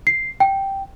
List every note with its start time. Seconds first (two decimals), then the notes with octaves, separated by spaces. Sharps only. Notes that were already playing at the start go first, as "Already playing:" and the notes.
0.07 C7
0.40 G5